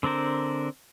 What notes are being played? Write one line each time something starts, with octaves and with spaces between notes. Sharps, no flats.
D3 C4 D4 A#4 C5